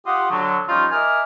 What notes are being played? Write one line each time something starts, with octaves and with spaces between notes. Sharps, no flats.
F4 G4 F#5 C6 D#6
D3 F#3
F3 G3 C#4 D#4 F4
A#4 D#5 E5 G#5 D6 F6